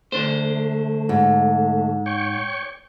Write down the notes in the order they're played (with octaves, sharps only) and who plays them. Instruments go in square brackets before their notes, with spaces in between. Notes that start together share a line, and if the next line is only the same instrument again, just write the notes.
[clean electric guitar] D3 D4 C5 [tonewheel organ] A3
[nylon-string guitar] G#2
[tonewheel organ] C#5 G5 C#6